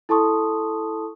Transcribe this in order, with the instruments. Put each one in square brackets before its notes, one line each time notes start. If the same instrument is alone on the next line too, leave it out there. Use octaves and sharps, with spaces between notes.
[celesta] E4 A4 A5 C6 C#6 D#6